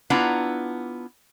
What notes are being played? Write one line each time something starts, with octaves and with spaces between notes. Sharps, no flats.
B3 D4 E4 F4 F#5 A#5